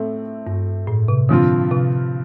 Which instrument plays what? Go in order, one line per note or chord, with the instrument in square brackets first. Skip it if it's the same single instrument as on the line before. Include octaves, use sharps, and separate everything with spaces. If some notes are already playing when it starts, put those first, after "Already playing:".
Already playing: [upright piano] A2 A3 C4
[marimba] G2
A2
C3
[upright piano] G2 F3 C4 F4 [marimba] D3
[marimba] C3